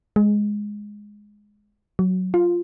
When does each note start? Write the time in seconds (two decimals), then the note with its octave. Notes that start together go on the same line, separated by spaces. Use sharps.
0.16 G#3
1.99 F#3
2.34 F4